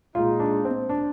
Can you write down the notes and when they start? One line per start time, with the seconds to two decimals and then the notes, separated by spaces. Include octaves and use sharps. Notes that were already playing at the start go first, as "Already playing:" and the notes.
0.14 A#2 G#3 D#4 F4
0.40 D4
0.65 C4
0.89 D4